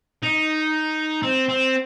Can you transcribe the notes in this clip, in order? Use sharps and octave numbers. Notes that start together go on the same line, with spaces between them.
D#4
C4
C4